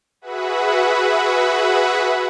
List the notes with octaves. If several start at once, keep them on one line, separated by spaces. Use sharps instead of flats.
F#4 G#4 B4 E5 F#5 B5